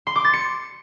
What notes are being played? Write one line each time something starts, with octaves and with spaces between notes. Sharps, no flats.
C6
D6
A6
C#7